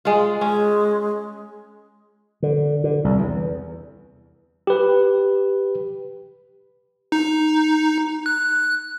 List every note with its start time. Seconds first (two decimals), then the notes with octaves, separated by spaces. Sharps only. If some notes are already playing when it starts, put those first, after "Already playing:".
0.05 G#3 F4
0.41 G#3 C#4
2.42 D3
2.84 D3
3.04 C2
3.18 E2
4.67 G4 B4
7.12 D#4
8.26 F#6